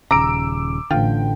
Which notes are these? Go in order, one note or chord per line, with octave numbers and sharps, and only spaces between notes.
D#1 G#1 C#3 A#5 D6 E6 D7
A1 D3 F4 G5